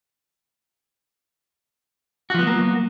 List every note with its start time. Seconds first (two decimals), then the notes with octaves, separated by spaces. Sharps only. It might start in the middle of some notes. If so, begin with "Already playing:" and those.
2.30 F#4
2.34 F3
2.39 B3
2.43 F#3
2.47 A#3